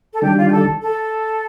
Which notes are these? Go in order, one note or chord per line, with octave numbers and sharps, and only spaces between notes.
A4
D#3 G3 D4 G4
F4
G4
A4
A4